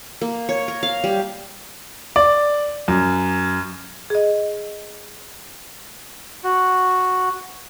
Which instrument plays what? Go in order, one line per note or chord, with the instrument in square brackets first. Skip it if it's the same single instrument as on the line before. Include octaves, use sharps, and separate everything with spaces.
[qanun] A#3
C#5
A#4
F5
G3
[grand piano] D5
F#2
[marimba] G#4 D#5
[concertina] F#4